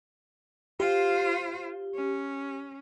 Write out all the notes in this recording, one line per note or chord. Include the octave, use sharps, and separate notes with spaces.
F4 G4 C5
C#4